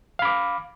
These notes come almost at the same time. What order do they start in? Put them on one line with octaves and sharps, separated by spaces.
F5 B5 D6